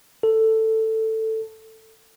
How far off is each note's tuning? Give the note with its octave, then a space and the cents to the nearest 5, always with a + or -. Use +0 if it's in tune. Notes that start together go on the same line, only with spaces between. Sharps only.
A4 +10